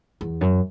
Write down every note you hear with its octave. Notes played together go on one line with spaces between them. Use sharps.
E2
F#2